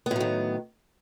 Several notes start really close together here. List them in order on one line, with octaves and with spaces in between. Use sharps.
B3 A2 F#3 D#3